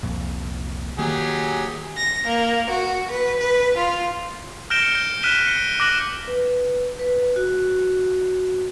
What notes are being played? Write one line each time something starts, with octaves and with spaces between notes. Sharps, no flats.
C2 F2 A#2
D#3 F#3 A#3 G4 G#4
A#6
A#3
F#4
B4
B4
F4
F6 G6 A#6 D7 E7 G7
F6 C#7
G6
F6 F#6 B6 D#7 E7 G7
C#7
D6 F#6 A#6 D#7 F#7
B4
B4
F#4